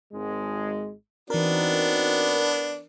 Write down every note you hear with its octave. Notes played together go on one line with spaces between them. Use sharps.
G#1 G#3
E3 B3 C4 D4 D#4 F#4 A#4